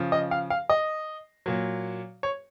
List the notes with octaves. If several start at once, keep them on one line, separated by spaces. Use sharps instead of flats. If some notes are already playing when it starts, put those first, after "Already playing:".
Already playing: C#3 F3
D#5
F5
F5
D#5
A#2 F#3
C#5